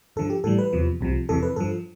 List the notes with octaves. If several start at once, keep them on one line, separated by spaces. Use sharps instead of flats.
G2 D3 F3 A4
G4
A2 E3 G3 A4
B4
E2 C3 F3
C2 C3 F3
F2 C3 E3 A4
B4
G2 F3 A4